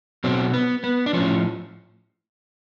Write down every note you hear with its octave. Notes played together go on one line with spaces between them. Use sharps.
B2 F#3 C4
B3
B3
D4
A2 F3 C#4